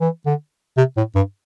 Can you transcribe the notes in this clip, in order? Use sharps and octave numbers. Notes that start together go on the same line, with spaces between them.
E3
D3
C3
A2
G2